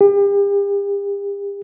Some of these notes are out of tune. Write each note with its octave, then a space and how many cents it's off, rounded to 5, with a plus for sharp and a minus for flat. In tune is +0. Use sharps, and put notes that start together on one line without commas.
G4 +40